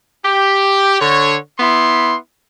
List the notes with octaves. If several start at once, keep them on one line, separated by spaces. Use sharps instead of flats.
G4
D3 C#5
B3 E4 C6